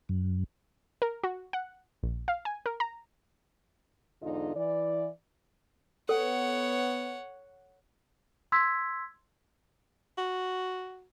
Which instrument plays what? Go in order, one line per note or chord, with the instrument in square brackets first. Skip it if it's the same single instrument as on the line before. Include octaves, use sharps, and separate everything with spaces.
[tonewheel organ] F#2
[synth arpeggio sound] A#4
F#4
F#5
A#1
F5
G#5
A#4
A#5
[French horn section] E2 G#2 D3 D#4 F4 D#5
E3 D5
[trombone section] B3 [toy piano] A4 [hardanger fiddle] C#5 F#5
[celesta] C6 E6 G#6 B6
[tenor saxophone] F#4